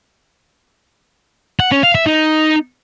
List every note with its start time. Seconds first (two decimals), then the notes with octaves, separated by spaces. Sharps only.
1.60 F#5
1.72 C#4
1.83 F5
1.95 E5
2.07 D#4